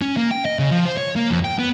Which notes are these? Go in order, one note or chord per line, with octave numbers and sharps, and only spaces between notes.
C#4
A#3
G5
D#5
C#3
F3
C5
C#5
A#3
F2
G5
B3